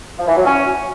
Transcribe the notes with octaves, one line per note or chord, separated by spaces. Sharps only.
F3
E3
F#3
C#4